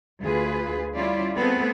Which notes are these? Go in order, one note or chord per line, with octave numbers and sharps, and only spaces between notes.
D2 F4 G#4 B4
G3 C#4 E4 F4 D5
A3 B3 C4 G#4 A4 B4